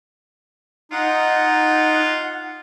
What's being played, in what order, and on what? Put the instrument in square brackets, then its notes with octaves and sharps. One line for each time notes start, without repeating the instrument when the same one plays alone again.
[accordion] D#4 [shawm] F4 [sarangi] F#5